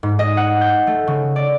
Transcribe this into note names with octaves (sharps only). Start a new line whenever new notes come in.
G#2
D#5
F#5
G6
A3
C#3
D5